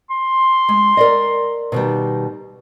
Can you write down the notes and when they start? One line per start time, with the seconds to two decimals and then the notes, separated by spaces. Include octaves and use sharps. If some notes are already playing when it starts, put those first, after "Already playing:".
0.10 C6
0.69 G#3
0.97 A#4 D5 D#5
1.72 B2 D#3 G3